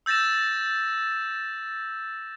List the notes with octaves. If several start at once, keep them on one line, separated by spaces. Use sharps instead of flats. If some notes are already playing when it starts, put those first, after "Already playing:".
E6 G6 A6 A#6 E7